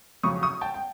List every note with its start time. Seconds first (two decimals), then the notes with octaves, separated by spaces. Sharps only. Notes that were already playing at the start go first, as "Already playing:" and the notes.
0.23 F2 C#3 F#3 C#6 D#6
0.43 C#6 D#6
0.61 G5 A5
0.74 G5